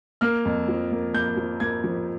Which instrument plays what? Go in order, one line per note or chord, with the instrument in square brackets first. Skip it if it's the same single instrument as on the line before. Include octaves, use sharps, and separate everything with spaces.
[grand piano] A#3 F6
F2
F3
A#3
A#3 G6
F3
A#3 G#6
F3